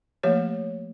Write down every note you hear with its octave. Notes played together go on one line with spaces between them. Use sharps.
F3 A3 A#3 G4 C#5 E5